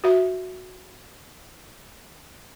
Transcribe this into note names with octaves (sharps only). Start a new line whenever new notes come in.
F#4 E5